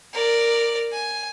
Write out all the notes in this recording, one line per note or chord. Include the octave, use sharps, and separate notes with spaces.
A#4 D5
G#5